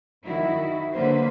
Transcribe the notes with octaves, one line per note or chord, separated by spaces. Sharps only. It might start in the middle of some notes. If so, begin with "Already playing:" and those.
D#3 F#3 E4 F#4
D3 F#3 A#3 B4 C5